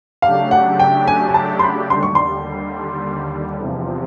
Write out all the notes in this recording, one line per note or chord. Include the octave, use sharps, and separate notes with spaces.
C#3 F#3 A3 D4 G4 F5
F#5
G5
G#5
G#5
A5
C6
B5
D#2 D3 G3 C6
C#6
C6
E2 C3 F3